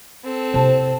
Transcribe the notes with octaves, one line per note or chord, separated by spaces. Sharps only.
C4 A4
C3 E4 C5 A5